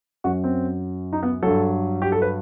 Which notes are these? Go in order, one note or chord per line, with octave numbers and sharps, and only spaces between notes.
F#2 F#3 F#4
C4
D#4
B3
G2 F#3 A4
G4
A4
B4